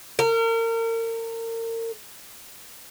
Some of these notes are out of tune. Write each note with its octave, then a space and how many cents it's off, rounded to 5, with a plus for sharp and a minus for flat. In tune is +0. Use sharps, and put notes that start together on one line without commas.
A#4 -35